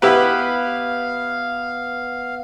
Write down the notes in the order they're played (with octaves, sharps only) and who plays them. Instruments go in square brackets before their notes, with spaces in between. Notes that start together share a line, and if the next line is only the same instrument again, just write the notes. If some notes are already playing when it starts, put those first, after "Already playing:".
[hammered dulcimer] B3 [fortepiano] E4 G4 B4 [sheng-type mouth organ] F5